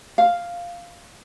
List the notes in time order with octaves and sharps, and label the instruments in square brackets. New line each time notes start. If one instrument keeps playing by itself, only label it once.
[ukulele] F5